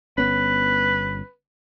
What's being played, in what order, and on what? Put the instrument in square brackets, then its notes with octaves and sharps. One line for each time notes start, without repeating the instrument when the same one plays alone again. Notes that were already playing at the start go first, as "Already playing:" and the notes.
[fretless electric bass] G1 B3 C#4 [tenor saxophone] B4